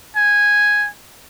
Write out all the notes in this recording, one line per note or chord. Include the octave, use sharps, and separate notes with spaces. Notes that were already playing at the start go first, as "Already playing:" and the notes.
G#5